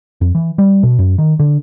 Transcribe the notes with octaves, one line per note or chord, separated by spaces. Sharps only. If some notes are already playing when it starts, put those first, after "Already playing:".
F2
E3
G3
B2
F#2
D#3
D3